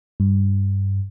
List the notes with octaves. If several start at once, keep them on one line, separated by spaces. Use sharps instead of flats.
G2